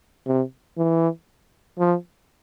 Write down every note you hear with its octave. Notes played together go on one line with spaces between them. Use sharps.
C3
E3
F3